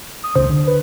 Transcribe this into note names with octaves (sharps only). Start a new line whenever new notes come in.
D#6
D#1 C#2 C#3 C5
D3
B4